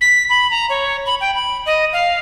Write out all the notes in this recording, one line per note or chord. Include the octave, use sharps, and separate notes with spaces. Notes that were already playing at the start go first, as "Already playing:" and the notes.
B6
B5
A#5
C#5
B5
G5
B5
D#5
F5